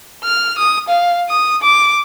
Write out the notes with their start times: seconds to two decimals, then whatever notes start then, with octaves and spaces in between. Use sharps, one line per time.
0.24 F6
0.58 D#6
0.89 F5
1.29 D#6
1.63 D6